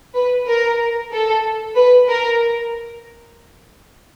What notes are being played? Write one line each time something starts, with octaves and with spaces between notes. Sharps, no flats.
B4
A#4
A4
B4
A#4